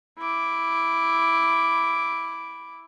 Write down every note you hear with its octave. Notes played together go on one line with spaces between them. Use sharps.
E4 D6